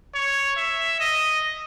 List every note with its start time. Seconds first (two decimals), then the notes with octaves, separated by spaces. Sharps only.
0.15 C#5
0.57 E5
1.00 D#5